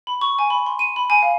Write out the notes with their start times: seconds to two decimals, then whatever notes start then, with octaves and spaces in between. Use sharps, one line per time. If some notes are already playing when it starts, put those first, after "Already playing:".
0.07 B5
0.21 C#6
0.39 G#5
0.50 B5
0.66 C6
0.79 D#7
0.96 B5
1.10 G#5
1.23 F5